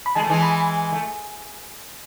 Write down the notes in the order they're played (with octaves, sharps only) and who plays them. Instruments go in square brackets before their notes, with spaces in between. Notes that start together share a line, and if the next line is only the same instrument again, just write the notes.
[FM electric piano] B5
[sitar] G#3 [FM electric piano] A5
[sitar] A3
E3 G#3
[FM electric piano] B5
[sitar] A3